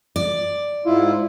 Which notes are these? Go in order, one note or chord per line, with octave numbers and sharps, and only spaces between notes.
D5
G#2 E4 F4